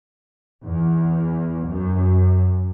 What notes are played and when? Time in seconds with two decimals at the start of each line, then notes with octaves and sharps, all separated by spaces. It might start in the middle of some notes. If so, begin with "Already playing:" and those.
0.63 E2
1.67 F#2